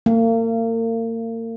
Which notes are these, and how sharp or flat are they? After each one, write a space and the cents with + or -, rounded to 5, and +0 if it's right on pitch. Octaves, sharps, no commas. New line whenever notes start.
A#3 -40